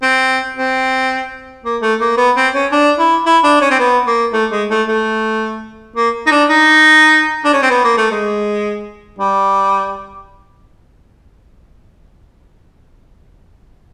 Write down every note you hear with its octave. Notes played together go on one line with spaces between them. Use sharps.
C4
C4
A#3
A3
A#3
B3
C4
C#4
D4
E4
E4
D4
C#4
C4
B3
A#3
A3
G#3
A3
A3
A#3
D#4
D4
D#4
D4
C#4
C4
B3
A#3
A3
G#3
G3